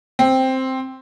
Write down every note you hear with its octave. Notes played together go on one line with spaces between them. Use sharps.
C4